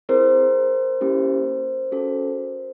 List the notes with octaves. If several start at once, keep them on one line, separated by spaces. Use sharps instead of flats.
C4 E4 G#4 A#4 C5
A#3 C#4 E4 G4
C#4 F#4 A4